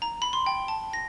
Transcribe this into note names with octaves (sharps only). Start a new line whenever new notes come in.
A#5
B5
C6
G5
A5
A#6